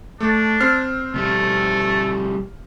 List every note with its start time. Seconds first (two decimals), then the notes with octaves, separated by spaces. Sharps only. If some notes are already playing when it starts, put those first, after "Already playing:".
0.20 A3 D4
0.60 C4 F6 C7
1.14 B2 G3 A3